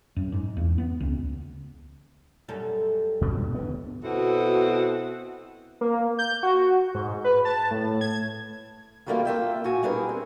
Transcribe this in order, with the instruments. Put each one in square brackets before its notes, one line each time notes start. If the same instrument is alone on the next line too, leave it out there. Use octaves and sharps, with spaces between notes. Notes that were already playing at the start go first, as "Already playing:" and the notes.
[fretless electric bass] F#2
G#2
E2
B3
C#2
[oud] F#2 G3 A4
[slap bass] D2 G2 B2
D3 B3
[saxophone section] B2 C4 E4 F#4 A4
[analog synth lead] A#3
G6
F#4
G#2
B4
A5
A2
G#6
[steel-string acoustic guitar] D#3 F#3 G3 A3 A#3 F4
A#3 F4 E5 G5
A#2 F#4 G#5
G3 B3 D4 E4 G#4 A#4
C4